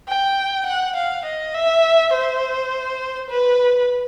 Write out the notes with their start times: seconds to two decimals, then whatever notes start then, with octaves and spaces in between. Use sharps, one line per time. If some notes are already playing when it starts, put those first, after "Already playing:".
0.08 G5
0.67 F#5
0.96 F5
1.25 D#5
1.55 E5
2.14 C5
3.30 B4